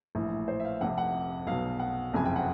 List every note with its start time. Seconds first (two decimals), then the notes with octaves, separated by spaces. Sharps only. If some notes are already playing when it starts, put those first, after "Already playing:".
0.15 A#1 A2 E3
0.48 C5
0.60 E5
0.65 F5
0.81 F1 F2 C3 F#5
0.98 F#5
1.47 B1 B2 F5
1.79 F#5
2.13 F#1 F2 C3 G#5
2.25 G5
2.36 F#5